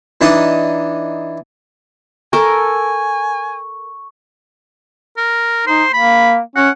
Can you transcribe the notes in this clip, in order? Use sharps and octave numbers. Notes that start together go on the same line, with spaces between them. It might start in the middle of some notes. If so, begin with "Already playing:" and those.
E3 D4 D#4 D#6
A4 A#4 G#5 C#6
A#4
D#4 C5
A#3 B5
C#4 F#5